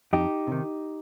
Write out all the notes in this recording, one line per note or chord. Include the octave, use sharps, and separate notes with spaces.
F2 D#4 G4
C3 D#3